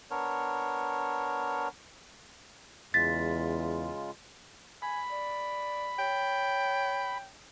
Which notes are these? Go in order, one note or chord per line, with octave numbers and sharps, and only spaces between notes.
B3 D4 A#4 C#5
E2 C#3 G#3 F4 A6 B6
G#5 B5
D5
C#5 G5